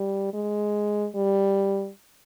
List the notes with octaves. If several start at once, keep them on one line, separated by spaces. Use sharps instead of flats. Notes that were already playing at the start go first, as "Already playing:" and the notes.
Already playing: G3
G#3
G3